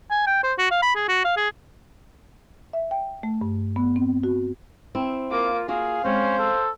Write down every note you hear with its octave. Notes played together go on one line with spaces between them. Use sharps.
G#5
G5
C5
F#4
F5
B5
G#4
F#4
F5
G#4
E5
G5
A3
G2
B3
C4
F#4
C4 E4
A#3 F4 D6
A#3 F4 F#4 G#4 F5
G#3 C4 C#4 C5
A4